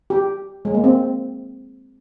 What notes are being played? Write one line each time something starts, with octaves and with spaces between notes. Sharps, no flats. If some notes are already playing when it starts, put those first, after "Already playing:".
G4
G#3
A#3
C4